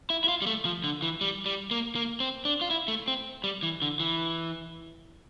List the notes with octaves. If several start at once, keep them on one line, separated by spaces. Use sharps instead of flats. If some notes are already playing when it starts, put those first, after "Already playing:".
E4
E4
F4
G3
A3
F3
D3
E3
G3
G3
A#3
A#3
C4
D4
F4
E4
A3
C4
G3
E3
D3
E3